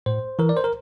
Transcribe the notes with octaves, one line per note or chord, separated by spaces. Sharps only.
A2 C5
E3 A#4
D5
C5
A#4